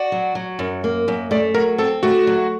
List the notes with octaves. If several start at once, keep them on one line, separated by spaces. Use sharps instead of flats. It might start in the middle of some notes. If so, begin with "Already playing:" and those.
Already playing: F#4 D5
F#3
F#3
F#2
A#3
F#2
A3 D5
F#3 A#4
C4 A4
A3 F#4
F#3